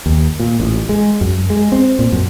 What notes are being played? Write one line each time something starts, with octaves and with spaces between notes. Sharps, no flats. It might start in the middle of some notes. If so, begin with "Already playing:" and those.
D#2
A#2
A1
G#3
F#2
G#3
C4
A#2
F#2